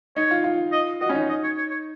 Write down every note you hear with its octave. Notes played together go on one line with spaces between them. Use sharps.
D#4 C#5
F4
F4
D#5
F#4 D#5
C#4
D#4
D#5
C#5
C#5
C#5